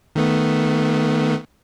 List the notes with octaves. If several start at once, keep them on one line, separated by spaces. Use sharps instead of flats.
D#3 A3 B3